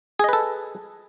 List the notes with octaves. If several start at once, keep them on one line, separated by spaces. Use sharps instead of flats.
G#4 A4 B4 D#5